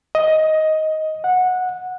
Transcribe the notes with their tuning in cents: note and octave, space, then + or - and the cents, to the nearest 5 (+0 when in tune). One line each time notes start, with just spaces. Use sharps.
D#5 +10
F#5 -15